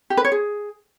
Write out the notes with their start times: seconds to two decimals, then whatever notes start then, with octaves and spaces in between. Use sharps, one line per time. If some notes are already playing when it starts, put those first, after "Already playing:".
0.10 G4
0.17 B4
0.25 C#5
0.32 G#4